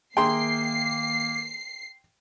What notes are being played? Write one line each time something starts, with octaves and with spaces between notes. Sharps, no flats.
D#3 A#3 G#4 E5 G5 A#5 C6 C7